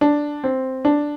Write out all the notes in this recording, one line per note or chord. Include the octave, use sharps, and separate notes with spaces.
D4
C4
D4